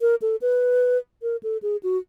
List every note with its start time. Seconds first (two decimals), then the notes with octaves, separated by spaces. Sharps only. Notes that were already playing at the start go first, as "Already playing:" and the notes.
0.01 A#4
0.22 A4
0.41 B4
1.22 A#4
1.43 A4
1.62 G#4
1.83 F#4